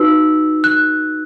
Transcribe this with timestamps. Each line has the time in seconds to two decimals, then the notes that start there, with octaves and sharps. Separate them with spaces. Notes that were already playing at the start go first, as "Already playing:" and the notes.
Already playing: D#4 F#4 B4 E6
0.64 F#6